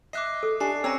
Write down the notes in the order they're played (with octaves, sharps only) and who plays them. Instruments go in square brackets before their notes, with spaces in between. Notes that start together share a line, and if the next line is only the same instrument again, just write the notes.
[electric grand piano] D#5 E5 [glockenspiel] D6 F#6 C7
[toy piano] A4
[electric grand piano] D4 [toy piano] G4 G#5 [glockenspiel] A5 C7
[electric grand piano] C4 C#5 [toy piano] C#4 A#5 [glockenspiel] E6 A#6 C#7